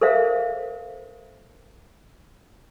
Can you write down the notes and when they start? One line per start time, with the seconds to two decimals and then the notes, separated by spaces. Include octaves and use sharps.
0.01 A4 A#4 C5 E5 F5